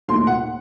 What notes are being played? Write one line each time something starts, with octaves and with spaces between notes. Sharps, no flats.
D#2 D#3 A3 C6
F#5